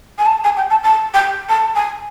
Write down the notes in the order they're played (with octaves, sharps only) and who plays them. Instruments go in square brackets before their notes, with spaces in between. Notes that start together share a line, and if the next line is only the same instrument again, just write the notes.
[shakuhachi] G#5
A5
G#5
G5
A5
A5
G5
A5
G#5